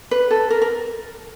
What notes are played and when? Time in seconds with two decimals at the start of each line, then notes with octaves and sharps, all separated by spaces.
0.11 B4
0.31 A4
0.50 A#4
0.62 A#4